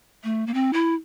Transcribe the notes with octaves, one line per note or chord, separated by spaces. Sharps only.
A3
A#3
C4
E4